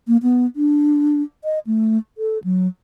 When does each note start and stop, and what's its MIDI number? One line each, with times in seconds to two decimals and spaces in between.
0.08 0.17 58
0.23 0.46 59
0.56 1.22 62
1.44 1.59 75
1.67 1.98 57
2.18 2.38 69
2.44 2.67 54